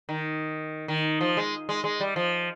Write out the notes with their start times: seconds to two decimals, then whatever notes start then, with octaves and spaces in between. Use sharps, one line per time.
0.09 D#3
0.88 D#3
1.21 F3
1.37 G#3
1.69 G#3
1.84 G#3
2.00 G3
2.16 F3